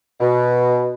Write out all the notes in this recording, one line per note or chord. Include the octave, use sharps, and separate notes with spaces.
B2